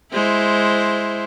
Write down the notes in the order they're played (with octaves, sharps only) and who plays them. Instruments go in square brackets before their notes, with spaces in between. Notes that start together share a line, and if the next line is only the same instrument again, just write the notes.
[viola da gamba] G#3 E4 C5